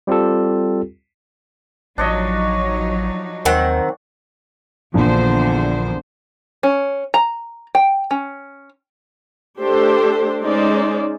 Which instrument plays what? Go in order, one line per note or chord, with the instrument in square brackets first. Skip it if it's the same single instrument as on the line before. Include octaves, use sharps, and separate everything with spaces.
[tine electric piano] G3 C4 F4 G4 A4
[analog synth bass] A1 [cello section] F3 F#3 D#4 [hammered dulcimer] D4 C#5 D#5
[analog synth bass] D#2 [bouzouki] D#3 C4 F#5
[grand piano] A#1 F3 [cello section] E2 D3 C5
[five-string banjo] C#4
A#5
G5
C#4
[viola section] A3 D4 G4 A4 C5
G#3 C#4 D#4 C5 D5